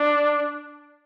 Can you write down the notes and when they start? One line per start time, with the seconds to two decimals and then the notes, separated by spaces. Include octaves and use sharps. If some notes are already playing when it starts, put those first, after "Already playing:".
Already playing: D4